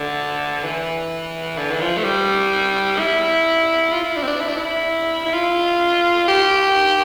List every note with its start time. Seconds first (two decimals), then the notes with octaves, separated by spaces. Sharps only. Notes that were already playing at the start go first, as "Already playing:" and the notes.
Already playing: D3
0.63 E3
1.57 D3
1.72 E3
1.80 F3
1.97 A3
2.04 G3
2.98 E4
3.92 F4
4.03 E4
4.16 D4
4.23 C4
4.27 D4
4.40 E4
4.48 D4
4.57 E4
5.25 E4
5.33 F4
6.28 G4